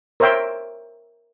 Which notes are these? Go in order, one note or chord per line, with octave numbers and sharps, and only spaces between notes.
A#4 C5 C#5 E5 G5 C6